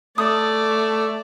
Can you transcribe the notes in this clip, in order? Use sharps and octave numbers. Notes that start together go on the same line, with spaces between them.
A3 D5 D#6